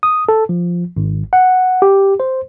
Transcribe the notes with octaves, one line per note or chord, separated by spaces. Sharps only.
D#6
A4
F3
G#1
F#5
G4
C5